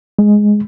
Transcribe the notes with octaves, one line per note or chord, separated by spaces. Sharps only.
G#3